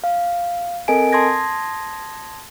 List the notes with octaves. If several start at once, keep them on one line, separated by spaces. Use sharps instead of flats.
F5
C4 A4 A#4 D#5 G#5 D7
A5 C6 D#6 G#6 A#6